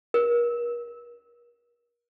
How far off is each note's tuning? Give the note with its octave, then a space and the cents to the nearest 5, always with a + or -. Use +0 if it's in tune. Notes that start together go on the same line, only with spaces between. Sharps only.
A#4 +40